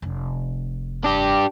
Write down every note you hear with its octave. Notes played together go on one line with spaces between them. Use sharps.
F1 C#4
D4 G4